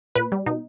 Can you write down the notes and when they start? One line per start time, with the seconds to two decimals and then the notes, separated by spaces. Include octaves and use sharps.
0.15 A#2 B4
0.32 G3
0.46 B2 D#4